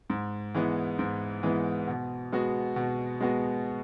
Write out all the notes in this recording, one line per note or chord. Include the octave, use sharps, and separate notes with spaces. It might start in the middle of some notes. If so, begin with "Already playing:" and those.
G#2
E3 G#3 B3
G#2
E3 G#3 B3
B2
G#3 B3 F#4
B2
G#3 B3 F#4